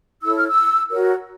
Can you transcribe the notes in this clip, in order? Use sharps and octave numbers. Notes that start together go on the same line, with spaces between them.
E4 A4 C#5 E6
F6
E6
F#4 A#4 C#5